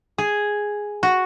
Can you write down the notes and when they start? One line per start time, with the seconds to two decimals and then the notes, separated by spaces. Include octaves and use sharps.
0.18 G#4
1.03 F#4